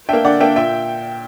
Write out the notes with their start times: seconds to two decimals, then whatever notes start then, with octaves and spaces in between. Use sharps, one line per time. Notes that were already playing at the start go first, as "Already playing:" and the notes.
0.09 A#3 D4 E5 G5
0.24 D3 D5 F#5
0.40 A#3 D4 E5 G5
0.56 A#2 E5 G5